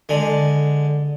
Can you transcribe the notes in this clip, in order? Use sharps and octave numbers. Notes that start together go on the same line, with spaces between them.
D3 G#3